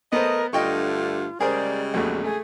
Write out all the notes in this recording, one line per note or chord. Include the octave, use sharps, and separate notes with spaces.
A3 B3 A#4 C5 D#5
G2 D3 A3 F4 D#5 G5 C#6
C#3 G3 G#3 G#4 A#4 C5 D5
A#1 E2 A3 F#4
A3 G#4